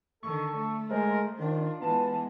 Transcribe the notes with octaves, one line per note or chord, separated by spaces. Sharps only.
D3 D#3 A4 C#6
A3
G#3 A#4 C5
D#3 D4 F4
E3 G#3 B3 A5